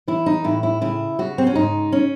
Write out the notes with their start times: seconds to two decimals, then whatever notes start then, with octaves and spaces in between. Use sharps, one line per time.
0.08 E3 E4
0.26 D#4
0.44 A2 E4
0.63 E4
0.81 C#3 E4
1.19 C#3 F#4
1.38 C4
1.47 C#4
1.55 G#2 D#4
1.92 C#4